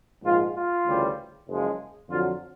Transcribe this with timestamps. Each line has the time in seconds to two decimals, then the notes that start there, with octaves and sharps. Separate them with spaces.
0.24 A#1 G#2 F3 F4
0.55 F4
0.86 D2 C#3 E3 G3
1.47 F#1 F#2 C#3 F3 G#3
2.09 F2 D3 F#3 F4